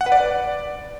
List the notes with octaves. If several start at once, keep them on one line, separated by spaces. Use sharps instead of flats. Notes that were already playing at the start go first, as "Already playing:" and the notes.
F#5
B4
D5